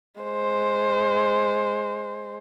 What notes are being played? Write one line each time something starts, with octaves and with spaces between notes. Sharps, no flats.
G#3 C5